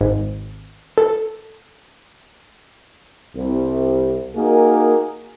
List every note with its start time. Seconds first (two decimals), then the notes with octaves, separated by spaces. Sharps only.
0.01 G#1
0.98 A4
3.36 C2
4.35 A#3 D#4 F#4 G#4 A#4